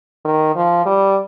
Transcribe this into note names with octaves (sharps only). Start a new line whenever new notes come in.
D#3
F3
G3